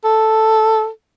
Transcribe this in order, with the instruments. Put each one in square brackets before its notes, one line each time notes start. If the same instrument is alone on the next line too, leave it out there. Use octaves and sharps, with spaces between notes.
[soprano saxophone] A4